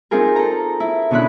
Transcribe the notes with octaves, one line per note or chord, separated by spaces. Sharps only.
C4 D#4 F4 G#4 A#4
A4 A#5
E4
B2 D3 C#4 E4 B5 F#6